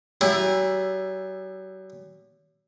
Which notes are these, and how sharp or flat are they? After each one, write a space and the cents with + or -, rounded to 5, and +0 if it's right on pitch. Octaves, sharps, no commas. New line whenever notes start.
F#3 +40 E4 +0 G4 +45